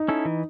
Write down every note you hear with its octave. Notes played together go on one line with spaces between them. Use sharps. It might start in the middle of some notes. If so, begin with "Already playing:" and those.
Already playing: D#4
C#4 E4 A4
E3